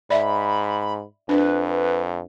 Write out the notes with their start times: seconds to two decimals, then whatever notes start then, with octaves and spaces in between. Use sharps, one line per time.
0.10 G#2 D5 E5 B5
1.29 F2 D4 B4